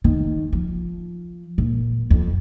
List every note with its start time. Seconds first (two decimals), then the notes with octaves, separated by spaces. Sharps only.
0.04 D#3
0.53 F3
1.58 A#2
2.10 F2